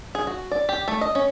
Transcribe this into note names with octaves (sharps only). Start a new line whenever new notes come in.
G#4
F#4
D5
G4
A3
D#5
C#4